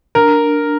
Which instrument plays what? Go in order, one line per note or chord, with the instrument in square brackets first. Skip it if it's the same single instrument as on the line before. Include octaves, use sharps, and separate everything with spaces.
[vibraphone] D4 [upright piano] A#4